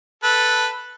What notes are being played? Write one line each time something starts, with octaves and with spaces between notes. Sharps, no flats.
A4 B4